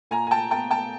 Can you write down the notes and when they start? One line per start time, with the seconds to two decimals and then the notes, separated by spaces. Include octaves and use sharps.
0.11 A#2 G#5 A#5
0.27 G#5
0.31 G5 A5
0.51 B3 G5 A5
0.71 G5 A5